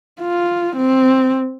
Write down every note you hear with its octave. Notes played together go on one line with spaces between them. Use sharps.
F4
C4